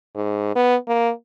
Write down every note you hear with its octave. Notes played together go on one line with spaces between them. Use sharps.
G#2
B3
A#3